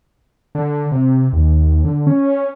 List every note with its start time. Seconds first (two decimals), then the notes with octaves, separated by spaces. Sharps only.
0.55 D3
0.92 C3
1.33 D#2
1.84 D3
2.07 C#4